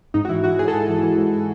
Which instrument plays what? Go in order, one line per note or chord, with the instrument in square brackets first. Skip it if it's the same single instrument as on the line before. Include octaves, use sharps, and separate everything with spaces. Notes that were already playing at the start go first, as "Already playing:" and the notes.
[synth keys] G#2 D#4
F#4
E3 E4
E3 F#4
G#2 G#4
A4
G#2 G#4
E3
E3
G#2